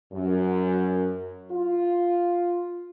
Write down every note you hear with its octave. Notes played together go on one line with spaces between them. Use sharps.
F#2
F4